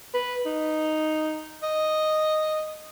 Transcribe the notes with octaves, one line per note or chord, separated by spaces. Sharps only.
B4
D#4
D#5